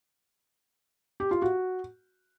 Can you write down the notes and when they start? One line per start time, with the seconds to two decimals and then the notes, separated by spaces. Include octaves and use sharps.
1.20 G4
1.31 F4
1.42 F#4